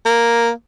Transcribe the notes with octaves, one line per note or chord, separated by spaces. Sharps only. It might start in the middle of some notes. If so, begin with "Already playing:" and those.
A#3